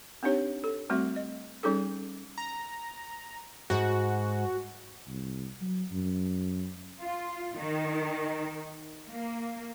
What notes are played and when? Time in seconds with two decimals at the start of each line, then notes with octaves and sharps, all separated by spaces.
0.23 C4 D4 D#4 G4 C#5
0.64 A4
0.90 G3 A3 C4 F#4 E5
1.16 D#5
1.63 G3 C#4 D#4 G#4 A4
2.38 A#5
3.70 G#2 F#4
5.08 C2
5.61 F#3
5.91 F#2
7.01 F4
7.57 D#3
9.10 A#3